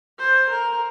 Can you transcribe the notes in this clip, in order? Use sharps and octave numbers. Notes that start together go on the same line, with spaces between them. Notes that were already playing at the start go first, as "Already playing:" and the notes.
C5
A#4